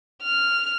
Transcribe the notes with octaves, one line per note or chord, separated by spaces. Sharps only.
F6